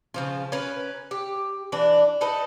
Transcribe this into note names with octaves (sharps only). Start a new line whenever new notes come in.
C#3 F3 F4
C#4 A#4 B4
G4
E3 D4
D#4 A4 B4 D#5